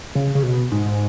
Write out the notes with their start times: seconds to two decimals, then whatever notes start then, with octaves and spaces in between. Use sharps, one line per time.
0.15 C#3
0.35 C#3
0.43 B2
0.72 G#2